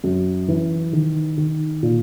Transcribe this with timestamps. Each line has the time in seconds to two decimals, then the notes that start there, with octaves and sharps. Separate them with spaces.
0.04 F#2
0.48 E3
0.93 D#3
1.38 D#3
1.83 A#2